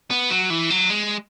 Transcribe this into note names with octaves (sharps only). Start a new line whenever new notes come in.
B3
F#3
E3
F#3
G#3